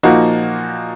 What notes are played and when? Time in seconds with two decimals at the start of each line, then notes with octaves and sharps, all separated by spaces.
0.03 A#2 F3 A#3 D#4 F#4